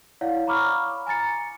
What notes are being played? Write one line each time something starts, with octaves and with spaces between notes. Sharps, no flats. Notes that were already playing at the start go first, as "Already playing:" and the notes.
E4 C#5 D5 F5 F#5
A#5 B5 C#6 D6 F6
G#5 A#5 A6 C#7